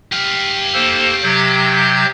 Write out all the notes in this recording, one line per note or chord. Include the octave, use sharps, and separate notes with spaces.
G4 F5
A#3 A4 C5
C3 F#3 G6